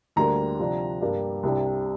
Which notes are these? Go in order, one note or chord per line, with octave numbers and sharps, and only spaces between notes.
D2 D3 G3 A#3 D4 A#5
C3 F3 D4
G2 G3 A#3 D4
C2 C3 G3 D4